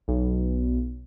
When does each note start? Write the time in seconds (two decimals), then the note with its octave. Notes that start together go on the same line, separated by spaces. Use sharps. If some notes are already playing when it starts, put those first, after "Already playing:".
0.08 B1